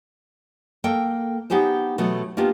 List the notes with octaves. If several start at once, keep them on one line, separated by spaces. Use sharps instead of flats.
A#3 A4 G5
B3 D#4 G4 G#4 C5
B2 E3 F#3 A3 B3
A#3 B3 D4 F4 G4